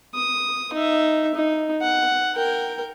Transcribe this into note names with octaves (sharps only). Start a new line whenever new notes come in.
D#6
D#4 E5
D#4
F#5
A#4 G5